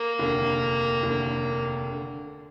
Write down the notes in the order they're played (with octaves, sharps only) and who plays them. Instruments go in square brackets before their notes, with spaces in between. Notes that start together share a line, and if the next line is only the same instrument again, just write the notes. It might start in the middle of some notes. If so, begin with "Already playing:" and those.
Already playing: [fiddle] A#3
[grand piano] F1 D#2 D3
F1 D#2 D3
D3